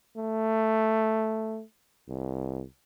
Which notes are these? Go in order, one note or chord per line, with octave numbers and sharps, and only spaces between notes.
A3
C2